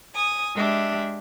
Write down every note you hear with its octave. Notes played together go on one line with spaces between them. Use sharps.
G#5 D#6
G#3 D4 G4 E5